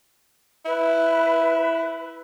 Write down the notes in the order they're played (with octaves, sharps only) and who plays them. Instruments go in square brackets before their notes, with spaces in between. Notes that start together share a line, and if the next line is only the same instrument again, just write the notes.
[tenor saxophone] E4 [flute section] B4